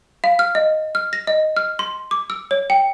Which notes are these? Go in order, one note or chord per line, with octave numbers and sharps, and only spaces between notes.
F5
F6
D#5
F6
A#6
D#5
F6
C6
D6
E6
C#5
G5